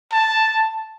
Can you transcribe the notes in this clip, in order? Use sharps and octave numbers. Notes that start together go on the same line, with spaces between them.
A5